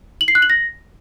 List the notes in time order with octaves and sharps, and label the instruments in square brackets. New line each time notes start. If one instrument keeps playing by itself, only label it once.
[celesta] F#7
C7
F#6
F#7
A#6